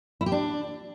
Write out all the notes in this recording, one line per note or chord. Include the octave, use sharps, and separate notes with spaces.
E4
G4
D4